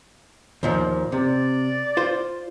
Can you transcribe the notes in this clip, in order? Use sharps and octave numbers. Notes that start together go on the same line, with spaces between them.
D#2 A#2 F3
C3 D5
F4 C5